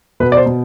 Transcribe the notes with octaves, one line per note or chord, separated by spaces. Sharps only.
B2 B4
D5
C5
B2